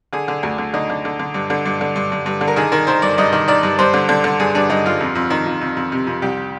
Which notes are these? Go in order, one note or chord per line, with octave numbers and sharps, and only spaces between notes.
D3 G#4
D3
D2
D3
D3 D#4
D3
D3
D3
G2
D3
G2
D3
G2
G2
G2
D3
A#4
D#3 G#4
D#3 A#4
D#3 C5
G2 D5
G2 D#5
D#3
D#3 D5
G2
G2 C5
D3
D3
D3
G2 G#4
G2 D4
G2 D#4
G2 F4
F2
F2
D#3
F2
F2
F2
C3
F2
C2 G4